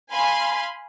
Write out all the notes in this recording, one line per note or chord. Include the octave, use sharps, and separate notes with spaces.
F5 G#5 B5 C6